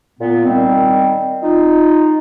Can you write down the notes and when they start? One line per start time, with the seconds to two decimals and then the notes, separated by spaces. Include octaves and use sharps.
0.19 A#2 B3
0.45 D#3 G3 C4
1.42 D#4 F4